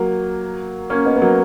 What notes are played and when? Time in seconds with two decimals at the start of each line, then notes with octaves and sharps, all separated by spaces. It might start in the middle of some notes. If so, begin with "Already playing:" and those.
Already playing: F#3 A#3
0.90 A#3 C#4
1.06 B3 D#4
1.16 B3
1.21 F#3 A#3